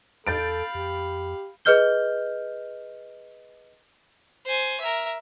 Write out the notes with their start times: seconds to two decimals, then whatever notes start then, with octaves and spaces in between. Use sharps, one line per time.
0.27 E2 A4 F5 B5 G6 A6 D7
0.75 F2 G4
1.65 G#4 B4 D#5 F6 G6 G7
4.46 C5 G#5
4.80 A#4 E5